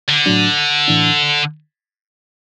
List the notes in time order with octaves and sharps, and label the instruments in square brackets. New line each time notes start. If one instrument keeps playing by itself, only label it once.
[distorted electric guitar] D3
[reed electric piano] A2 F#3 D4
A2 E3 D4